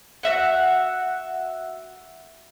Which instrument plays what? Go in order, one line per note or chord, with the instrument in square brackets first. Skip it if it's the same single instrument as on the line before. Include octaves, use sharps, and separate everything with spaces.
[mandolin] F#4 E5 F#5